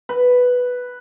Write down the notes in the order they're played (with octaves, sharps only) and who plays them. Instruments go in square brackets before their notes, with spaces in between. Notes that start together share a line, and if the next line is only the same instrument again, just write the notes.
[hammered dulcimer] B4